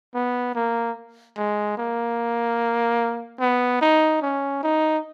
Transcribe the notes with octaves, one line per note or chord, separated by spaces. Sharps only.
B3
A#3
G#3
A#3
B3
D#4
C#4
D#4